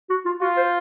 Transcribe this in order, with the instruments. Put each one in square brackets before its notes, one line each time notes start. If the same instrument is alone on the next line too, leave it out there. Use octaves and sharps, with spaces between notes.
[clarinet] F#4
F4
[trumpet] F4 [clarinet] F#4
[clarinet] C5